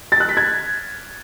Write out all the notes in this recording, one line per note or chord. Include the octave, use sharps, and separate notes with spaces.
A6
F#6
B6
G#6